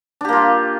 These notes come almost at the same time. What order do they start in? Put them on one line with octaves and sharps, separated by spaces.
D4 G4 A#3 F4